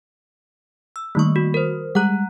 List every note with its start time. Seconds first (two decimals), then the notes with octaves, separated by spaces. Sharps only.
0.96 E6
1.15 D#3 G3 A3 A#3 C#6
1.36 F#4
1.54 A#4 C5
1.95 G3 G#3 F#5 A#5 F#6